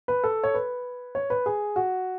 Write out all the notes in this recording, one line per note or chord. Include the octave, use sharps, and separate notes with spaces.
B4
A4
C#5
B4
C#5
B4
G#4
F#4